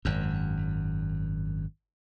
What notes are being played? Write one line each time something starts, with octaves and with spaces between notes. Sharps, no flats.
G#1 F#2